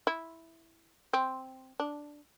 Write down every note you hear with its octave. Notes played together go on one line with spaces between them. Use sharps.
E4
C4
D4